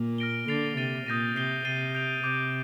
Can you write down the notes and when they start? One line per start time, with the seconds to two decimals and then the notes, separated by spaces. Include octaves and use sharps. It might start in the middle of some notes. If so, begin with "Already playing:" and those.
Already playing: A#2 A#3
0.18 F6 A#6 D7 G7
0.48 D3 A6 C7 F7
0.77 C3 A6 D#7 G7
1.06 A#2 D#6 G6 A#6 D#7
1.36 C3 G6 C7 G7
1.65 C3 A6 C7 D#7 G7
1.95 G6 D7 F7
2.24 C3 D6 G6 D7